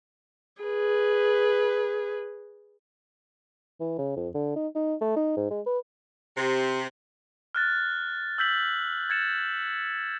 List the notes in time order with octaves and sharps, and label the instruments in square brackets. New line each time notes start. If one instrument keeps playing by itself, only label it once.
[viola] G#4 B4
[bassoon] E3
C#3
F2
D3
D#4
D#4
A3
D#4
G#2
G#3
B4
[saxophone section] C3
[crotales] F6 F#6 A6
E6 G6 B6 F#7
G#6 A6 C#7 E7